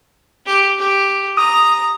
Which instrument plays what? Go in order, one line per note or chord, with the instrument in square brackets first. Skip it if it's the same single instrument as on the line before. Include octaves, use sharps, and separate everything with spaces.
[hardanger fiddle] G4
G4
[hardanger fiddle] A#5 [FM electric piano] D#6